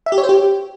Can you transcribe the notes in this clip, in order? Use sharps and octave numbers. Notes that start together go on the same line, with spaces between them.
E5
G4
C#5
C5
G4